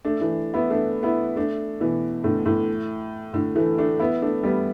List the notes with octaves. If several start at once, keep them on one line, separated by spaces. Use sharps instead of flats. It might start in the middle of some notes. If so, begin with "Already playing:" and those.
A3 D4
E3 A3
B3 E4
A3 D4
B3 E4
A3 D4
B2 E3
A2 D3
A2
A2 D3
E3 A3
A3 D4
B3 E4
A3 D4
G3 B3